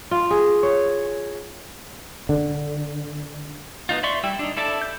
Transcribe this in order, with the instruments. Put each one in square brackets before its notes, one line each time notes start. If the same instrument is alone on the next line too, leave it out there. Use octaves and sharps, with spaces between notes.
[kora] F4
G#4
C#5
[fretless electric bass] D3
[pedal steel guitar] B3 C4 D#4 F4
D5 E5 C6 C#6
G3 E4 G5 E6
D4 D#4
E4 A4 D5 E5 A5
G6